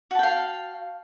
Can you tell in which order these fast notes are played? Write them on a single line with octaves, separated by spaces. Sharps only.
F#4 A5 G5 F5